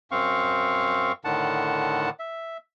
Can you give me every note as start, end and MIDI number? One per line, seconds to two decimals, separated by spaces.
0.11 1.12 42
0.11 1.12 60
0.11 1.12 77
0.11 1.12 85
1.24 2.10 45
1.24 2.10 50
1.24 2.10 51
1.24 2.10 78
1.24 2.10 81
2.19 2.57 76